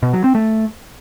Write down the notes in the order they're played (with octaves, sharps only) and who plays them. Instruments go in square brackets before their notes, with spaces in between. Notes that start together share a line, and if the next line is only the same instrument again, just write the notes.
[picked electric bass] B2
F#3
C4
A3